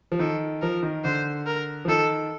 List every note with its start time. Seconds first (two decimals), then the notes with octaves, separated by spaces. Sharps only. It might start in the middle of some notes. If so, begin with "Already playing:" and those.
0.12 F3
0.19 D#3 A4
0.61 F3 A#4
0.83 D#3
1.04 D3 C5
1.46 A#4
1.85 F3
1.88 D#3 A4